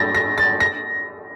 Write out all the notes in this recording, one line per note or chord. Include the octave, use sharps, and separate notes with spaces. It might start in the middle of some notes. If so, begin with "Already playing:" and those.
Already playing: A6 A#6
A#6
A6
A#6